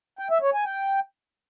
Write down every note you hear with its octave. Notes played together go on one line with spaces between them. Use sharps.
G5
E5
C#5
G#5
G5